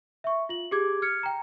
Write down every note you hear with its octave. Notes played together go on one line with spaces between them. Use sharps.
E5 C#6
F4 F#7
G4 G#4 D6 G#6
F6 G#6 C#7
G5 A#5